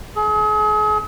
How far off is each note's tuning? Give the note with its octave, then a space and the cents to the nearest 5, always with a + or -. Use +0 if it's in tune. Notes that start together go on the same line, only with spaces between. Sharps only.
G#4 +40